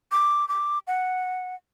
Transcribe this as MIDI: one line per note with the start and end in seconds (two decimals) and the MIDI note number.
0.12 0.48 86
0.49 0.79 86
0.87 1.55 78